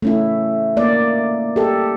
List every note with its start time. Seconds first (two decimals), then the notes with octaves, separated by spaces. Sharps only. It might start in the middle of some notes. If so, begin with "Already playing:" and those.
0.02 A3 C#4 E4
0.77 A#3 D5
1.56 G4 A4